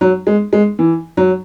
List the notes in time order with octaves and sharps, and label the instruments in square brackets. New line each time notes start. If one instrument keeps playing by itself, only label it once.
[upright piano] F#3
G#3
G#3
E3
F#3